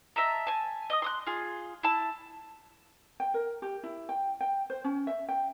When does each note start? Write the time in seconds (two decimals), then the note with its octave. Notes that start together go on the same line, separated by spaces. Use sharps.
0.16 D#5 E5 A5 A#5
0.47 G#5 A5
0.90 D#5 D6 D#6
1.02 C6 D#6 F#6
1.26 F4 G#4
1.83 E4 A5
3.20 G5
3.34 A#4
3.62 G4
3.84 E4
4.09 G5
4.41 G5
4.70 C5
4.84 C#4
5.07 E5
5.29 G5